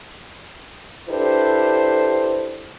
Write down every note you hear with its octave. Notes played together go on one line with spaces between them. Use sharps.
D4 E4 G4 A4 B4 C5